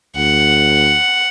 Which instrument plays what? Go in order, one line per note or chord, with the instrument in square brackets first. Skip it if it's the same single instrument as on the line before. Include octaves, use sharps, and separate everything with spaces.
[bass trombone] D2 [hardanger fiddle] F#5